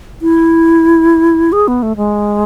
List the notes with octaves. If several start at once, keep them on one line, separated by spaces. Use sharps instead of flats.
E4
G#4
B3
A3
G#3